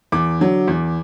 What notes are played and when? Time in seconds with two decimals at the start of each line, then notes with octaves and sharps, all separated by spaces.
0.12 E2 D6
0.40 D3 F#3
0.68 E2